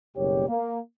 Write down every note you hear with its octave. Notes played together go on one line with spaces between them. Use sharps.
F#1 B2 G3 A#3 G4 C#5
A#3